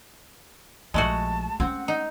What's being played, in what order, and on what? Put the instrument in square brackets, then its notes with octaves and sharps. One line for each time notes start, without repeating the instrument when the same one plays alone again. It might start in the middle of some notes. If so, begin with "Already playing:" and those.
[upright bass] A#1 F3 [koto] G#3 A3 F#4 [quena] A5
[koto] C4 [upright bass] C#4 [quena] F#5
[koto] D#4